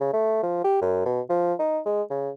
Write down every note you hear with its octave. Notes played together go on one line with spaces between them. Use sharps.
C#3
A3
F3
G4
F#2
B2
F3
D#4
G#3
C#3